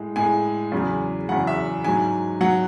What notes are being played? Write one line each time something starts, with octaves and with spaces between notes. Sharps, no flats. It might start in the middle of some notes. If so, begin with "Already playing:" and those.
Already playing: A2 G#3
A2 G#3 G#5
E2 C#3 F#3
E2 C#3 F#3 F#5
E5
G#2 F#3 G#5
F#3 F#5